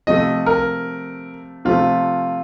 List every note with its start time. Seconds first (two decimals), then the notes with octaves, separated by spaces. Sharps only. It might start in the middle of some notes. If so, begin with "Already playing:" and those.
0.07 C3 F3 A3 D#5
0.46 A#4
1.65 C3 F3 A3 F4